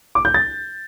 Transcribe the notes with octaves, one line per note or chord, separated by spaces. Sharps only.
D6
G6
A6